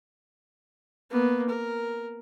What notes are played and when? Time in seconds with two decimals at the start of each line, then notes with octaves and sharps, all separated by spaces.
1.11 A#3 B3
1.50 A#4